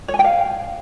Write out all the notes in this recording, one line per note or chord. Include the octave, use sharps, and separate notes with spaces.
C#5
G#5
G5
F5